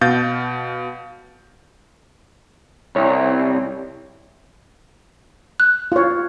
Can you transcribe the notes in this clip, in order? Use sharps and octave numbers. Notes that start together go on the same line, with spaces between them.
B2 F5 G6 A6
C2 C#5
F#6
F4 C#5